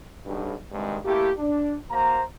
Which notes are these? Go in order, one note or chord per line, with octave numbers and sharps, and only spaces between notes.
B1 G2
G2 C3 D#3 G#3
A3 A#3 E4 G4
D4
A#3 F#4 C5 A#5